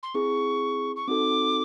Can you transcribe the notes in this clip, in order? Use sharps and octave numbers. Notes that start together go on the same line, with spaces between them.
C6
C4 E4 G#4 C#6
C#6
C4 D#4 F#4 A4 D6